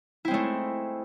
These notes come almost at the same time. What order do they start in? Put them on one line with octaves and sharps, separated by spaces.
E4 C4 G#3 A3